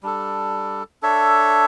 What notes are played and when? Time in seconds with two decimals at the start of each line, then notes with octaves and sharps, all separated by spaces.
0.03 G3 D4 A4
1.02 D4 A4 C#5 E5